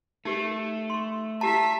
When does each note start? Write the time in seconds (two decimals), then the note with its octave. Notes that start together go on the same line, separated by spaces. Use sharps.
0.25 A3 D#4 G4 A#4
0.90 C6 C#6
1.41 E4 G4 E5 A5 A#5 B6